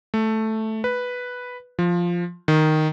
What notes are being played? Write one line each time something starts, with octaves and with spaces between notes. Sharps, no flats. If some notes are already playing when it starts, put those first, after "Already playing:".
A3
B4
F3
D#3